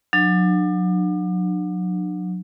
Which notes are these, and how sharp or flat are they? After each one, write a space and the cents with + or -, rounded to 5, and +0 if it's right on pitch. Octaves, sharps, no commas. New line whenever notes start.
F#3 -30 D4 +40